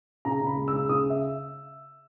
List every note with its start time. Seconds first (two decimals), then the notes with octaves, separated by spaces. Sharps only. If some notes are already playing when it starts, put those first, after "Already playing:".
0.25 C#3 A#5
0.41 C#3
0.46 B5
0.57 G#3
0.68 E6
0.73 C#3
0.89 C#3 D#6
1.10 E5